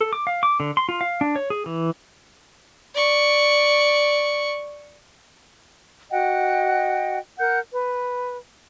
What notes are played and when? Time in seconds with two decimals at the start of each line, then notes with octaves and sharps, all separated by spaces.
0.01 A4
0.13 D6
0.27 F5
0.43 D6
0.60 D3
0.77 C6
0.89 F4
1.01 F5
1.21 D4
1.36 C#5
1.50 G#4
1.66 E3
2.95 D5 C#6
6.11 F#4 D#5 F#5 G5
7.39 A#4 F#5 G6
7.73 B4